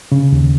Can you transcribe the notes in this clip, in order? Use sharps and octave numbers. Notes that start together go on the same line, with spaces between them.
C#3
D#2